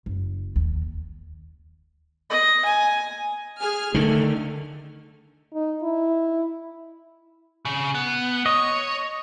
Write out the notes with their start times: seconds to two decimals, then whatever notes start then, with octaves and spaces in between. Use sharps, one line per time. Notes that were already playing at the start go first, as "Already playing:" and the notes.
0.06 F#1
0.56 D#2
2.30 D#5
2.65 G#5
3.60 G#4 G#5 F6
3.94 D3 D#3 A3
5.54 D#4
5.83 E4
7.65 C#3
7.95 B3
8.46 C#5 D#5